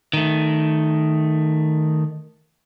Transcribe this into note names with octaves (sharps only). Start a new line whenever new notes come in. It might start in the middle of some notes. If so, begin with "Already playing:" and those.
D#3 A3